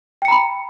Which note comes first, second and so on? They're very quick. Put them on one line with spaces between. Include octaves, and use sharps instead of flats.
G5 C#7 A#5 B5